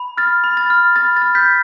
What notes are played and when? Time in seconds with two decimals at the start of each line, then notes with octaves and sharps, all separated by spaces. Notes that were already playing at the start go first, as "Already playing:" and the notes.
Already playing: B5
0.18 F6 A6
0.44 B5
0.57 A6
0.70 F6
0.96 B5 A6
1.16 A6
1.22 F6
1.35 G6 B6